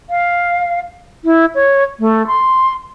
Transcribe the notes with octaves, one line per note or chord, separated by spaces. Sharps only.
F5
E4
C#5
A3
C6